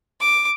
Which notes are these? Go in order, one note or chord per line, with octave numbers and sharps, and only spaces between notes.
D6